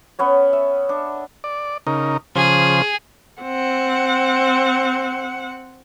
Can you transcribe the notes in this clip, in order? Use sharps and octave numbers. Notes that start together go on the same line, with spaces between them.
B3 C#4 C#5
E5
D4
D5
C#3 D#4 A#4
C#3 F3 G#4 C5
C4 F#5